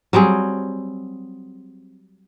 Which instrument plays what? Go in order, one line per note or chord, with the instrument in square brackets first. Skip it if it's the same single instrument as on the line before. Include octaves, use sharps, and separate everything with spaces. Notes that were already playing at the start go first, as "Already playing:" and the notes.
[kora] F#3 G3 C4 G#4